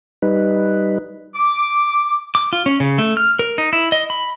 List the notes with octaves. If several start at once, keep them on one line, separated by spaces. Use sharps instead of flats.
G3 D#4 B4
D6
D6
F4
C#4
C#3
A3
F6
A#4
D#4
E4
D#5
B5